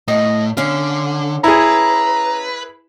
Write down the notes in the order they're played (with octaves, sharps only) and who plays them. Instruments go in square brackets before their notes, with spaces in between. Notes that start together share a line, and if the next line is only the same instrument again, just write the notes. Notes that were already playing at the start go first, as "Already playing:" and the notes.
[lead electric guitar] A2 [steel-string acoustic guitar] D#5
[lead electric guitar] D3 [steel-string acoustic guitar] C#4 F5
[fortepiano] E4 G#4 [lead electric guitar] B4 [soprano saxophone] A#5